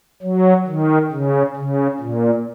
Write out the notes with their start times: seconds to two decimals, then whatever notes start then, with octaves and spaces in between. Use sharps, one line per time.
0.23 F#3
0.67 D#3
1.12 C#3
1.57 C#3
2.00 A#2